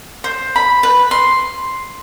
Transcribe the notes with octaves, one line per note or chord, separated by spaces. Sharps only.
C5
B5
B4
C6